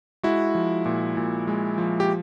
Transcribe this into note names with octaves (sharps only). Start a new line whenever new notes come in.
G#3 E4 F#4
F3
A#2
A#2
G#3
F3
G4